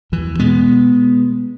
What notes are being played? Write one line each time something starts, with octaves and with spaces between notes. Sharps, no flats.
E2 E3
B2 G#3 B3